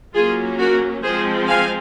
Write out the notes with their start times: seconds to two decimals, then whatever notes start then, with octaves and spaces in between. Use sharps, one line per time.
0.14 F#3 A#3 C#4 F4 G#4
0.58 F#4 A#4
1.03 F3 G#3 C4 G#4 C5
1.47 F5 G#5